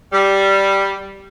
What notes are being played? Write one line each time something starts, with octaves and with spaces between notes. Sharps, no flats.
G3